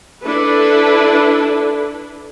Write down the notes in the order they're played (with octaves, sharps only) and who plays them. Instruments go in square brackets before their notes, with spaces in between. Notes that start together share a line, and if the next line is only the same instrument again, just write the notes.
[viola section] D4 E4 A4 B4